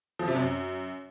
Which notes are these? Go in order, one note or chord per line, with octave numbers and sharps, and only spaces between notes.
F3
C3
F#2